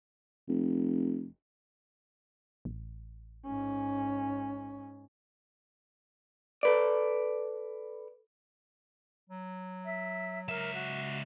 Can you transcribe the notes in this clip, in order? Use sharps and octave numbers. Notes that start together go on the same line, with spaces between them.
F1
A1
G#2 C#4
A4 B4 D5
F#3
E5
C#2 A#4 E5
F#4